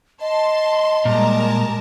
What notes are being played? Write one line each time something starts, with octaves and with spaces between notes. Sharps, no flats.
D#5 A5 C6
A#2 G3 G#3 A#4 A5 A#5